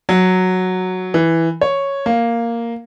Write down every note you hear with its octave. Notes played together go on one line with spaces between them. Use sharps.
F#3
E3
C#5
A#3